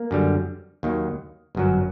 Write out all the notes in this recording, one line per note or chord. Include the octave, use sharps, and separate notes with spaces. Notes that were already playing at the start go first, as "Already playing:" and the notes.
Already playing: A#3
F#2 D3 G3
D#2 D#3 F#3
G1 F#2 F#3